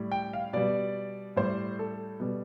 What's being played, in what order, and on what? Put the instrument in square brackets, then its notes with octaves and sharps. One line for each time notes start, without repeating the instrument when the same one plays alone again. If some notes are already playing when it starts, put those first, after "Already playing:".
Already playing: [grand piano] A2 G3
G5
F5
B2 G3 D5
A2 G3 C5
A4
B2 G3